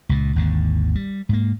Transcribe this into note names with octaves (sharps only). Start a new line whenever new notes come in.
C#2 A#2
G#1 D#2 D3
G3
G#2 A#3